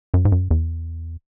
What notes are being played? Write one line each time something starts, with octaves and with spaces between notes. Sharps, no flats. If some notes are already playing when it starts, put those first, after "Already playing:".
F#2
G#2
F#2
E2